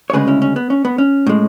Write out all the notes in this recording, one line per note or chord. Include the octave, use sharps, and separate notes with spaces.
C#5
D2 C#3 G#3 G#4 B4
C#4 E4
C#4
B3
C#4
B3
C#4
A2 G#3